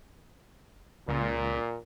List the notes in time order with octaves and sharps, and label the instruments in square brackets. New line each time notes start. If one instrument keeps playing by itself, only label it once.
[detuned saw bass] C#2 [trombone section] A#2